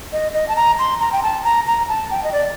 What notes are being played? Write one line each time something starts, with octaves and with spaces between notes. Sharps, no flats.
D#5
D#5
A5
A#5
C6
A#5
G5
A5
A#5
A#5
A5
G5
D#5
D5